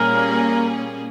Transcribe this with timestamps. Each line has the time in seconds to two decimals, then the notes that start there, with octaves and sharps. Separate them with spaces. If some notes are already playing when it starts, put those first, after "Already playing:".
Already playing: A#2 G3 A#3 C#4 G#4 A#4